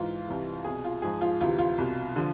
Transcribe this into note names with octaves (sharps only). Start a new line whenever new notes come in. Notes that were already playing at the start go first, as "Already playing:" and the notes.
Already playing: G#2 E3 F4
C2 C3 E3
C2 B2 G#4
F4
G#2 F3 G#4
F4
D2 C3 E3 F4
F4
C2 B2
D3 F3